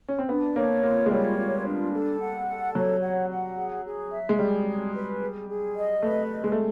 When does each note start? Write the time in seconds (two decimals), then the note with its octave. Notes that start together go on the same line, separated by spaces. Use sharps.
0.08 C#4
0.19 C4
0.28 B3 D4
0.56 A#3 C#5
0.83 A#3 F4
1.06 G#3
1.11 G3 C#5
1.38 F4
1.65 D4
1.93 A4
2.20 F#5
2.47 A4
2.75 F#3 C#5
3.02 F#5
3.30 F#5
3.57 G#4
3.85 G#4
4.12 E5
4.29 G#3
4.39 G3 G#4
4.66 G#4
4.94 B4
5.21 G#4
5.48 G#4
5.75 D#5
6.02 A3 B4
6.30 D#5
6.44 G#3
6.52 A3